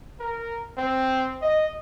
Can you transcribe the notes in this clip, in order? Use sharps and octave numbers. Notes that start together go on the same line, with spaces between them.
A#4
C4
D#5